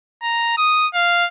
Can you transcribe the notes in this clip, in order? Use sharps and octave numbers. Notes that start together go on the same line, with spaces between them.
A#5
D#6
F5